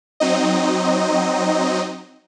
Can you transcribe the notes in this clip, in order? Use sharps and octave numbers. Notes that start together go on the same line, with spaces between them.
F#3 C4 D#4 D#5